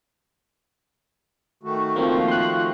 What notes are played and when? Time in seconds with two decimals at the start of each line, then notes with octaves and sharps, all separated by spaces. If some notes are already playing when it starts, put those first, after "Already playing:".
1.63 D#3 A3 F#4
1.96 F3 A#3 C4
2.28 C6 F#6